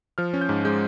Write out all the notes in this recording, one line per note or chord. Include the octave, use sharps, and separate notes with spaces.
F3 F6
C#4
G6
G#2
G#3 G6